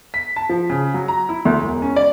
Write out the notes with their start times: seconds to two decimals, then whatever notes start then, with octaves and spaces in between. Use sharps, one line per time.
0.14 B6
0.36 A5
0.50 F3
0.70 C#3
0.94 F#3
1.08 A#5
1.29 E4
1.45 D2
1.62 E1
1.82 C#4
1.96 D5